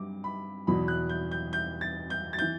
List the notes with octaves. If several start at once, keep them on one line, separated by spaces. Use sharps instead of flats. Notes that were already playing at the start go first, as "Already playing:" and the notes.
Already playing: G2 F#3 D6
B5
E2 B2 F#3 B5
F#6
G6
G6
G6
A6
G6
A6
E3 G6